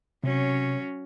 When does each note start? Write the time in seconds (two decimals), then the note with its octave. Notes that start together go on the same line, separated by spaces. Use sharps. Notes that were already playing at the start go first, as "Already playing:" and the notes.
0.24 C3 F#3 C#4